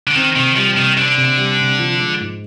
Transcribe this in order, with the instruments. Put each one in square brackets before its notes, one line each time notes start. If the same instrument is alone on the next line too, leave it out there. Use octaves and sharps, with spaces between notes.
[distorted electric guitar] D3
[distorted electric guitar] D#3 [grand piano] C4
[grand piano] C3 [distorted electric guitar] D#3
[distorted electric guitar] F3 [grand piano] G3
[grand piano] C3 [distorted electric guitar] D#3
[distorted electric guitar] D3 [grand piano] C4
[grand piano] C3
G3
C3
F3
G#3
G#2